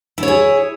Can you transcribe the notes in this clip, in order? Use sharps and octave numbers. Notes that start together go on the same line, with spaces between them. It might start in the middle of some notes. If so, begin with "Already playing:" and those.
E4 G#4 C#5